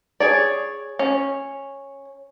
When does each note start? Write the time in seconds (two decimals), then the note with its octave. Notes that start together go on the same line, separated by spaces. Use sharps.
0.20 G#4 C#5 D5
0.99 C#4